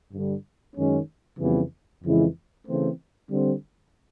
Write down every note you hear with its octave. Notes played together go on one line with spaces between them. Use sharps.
G2 D3 G3
F#2 D#3 G#3 C#4
F2 C#3 E3 G3 B3
F2 C#3 E3 G#3
C#3 E3 A3 C4
D3 G3 C4